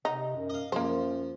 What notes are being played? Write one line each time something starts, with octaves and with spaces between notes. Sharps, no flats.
C3 D#4
F#2
D#5 F5
F#2 F3 A#3 C5